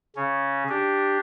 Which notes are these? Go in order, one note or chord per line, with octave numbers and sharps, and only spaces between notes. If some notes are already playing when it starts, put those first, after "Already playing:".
C#3 C#4
D4 G4